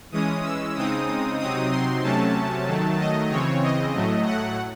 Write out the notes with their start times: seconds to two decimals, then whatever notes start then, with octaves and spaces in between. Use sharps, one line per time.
0.12 E3 G#3 C#4 D#6
0.44 E6
0.75 C#3 G#3 C4 D#4 D#6
1.39 C3 F#3 C4 D#4 D#6
1.71 C6
2.03 C3 F#3 A3 C#4 A5
2.67 D#3 F#3 A3
2.99 D#5
3.30 C#3 E3 C4 C#5
3.63 D#5
3.94 A2 F#3 A3
4.26 F#5